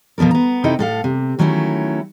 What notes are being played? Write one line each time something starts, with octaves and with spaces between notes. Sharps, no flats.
B2 F3 B3 A4 A#4
B3 A#5
C3 D#4 E4 A4 D#5 G5
A2 A4 F5
C3
D#3 F#3 A3 C#4 E4